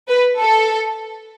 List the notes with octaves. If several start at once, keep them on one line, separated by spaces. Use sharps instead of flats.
B4
A4